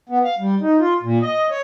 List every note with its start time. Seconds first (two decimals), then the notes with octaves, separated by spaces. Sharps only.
0.09 B3
0.24 F5
0.39 G3
0.61 D#4
0.79 F4
1.03 A#2
1.22 D#5
1.50 C#5